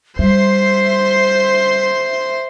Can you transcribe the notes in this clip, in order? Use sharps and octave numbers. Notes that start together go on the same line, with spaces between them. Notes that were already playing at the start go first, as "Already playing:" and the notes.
G3 C5 E5 C6